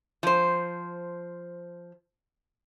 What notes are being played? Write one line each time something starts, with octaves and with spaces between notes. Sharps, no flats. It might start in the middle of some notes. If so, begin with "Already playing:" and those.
F3 C5